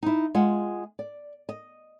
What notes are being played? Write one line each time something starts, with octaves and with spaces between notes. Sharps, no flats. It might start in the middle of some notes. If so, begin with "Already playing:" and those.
D#4 E4
G#3 F4 F#5
D5
D#5